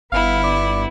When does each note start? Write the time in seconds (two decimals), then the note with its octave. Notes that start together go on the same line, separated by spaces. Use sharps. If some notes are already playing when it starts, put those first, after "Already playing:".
0.12 G1 B3 E4 F5
0.44 D5